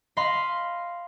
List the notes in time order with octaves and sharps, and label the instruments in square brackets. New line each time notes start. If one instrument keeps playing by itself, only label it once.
[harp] D#5 F5 B5 C6